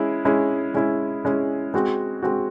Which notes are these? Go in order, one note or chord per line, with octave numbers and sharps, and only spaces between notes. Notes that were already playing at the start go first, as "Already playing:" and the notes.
Already playing: G#3 C#4 E4
G#3 C#4 E4
G#3 C#4 E4
G#3 C#4 E4
G#3 C4 F#4
G#3 C4 F#4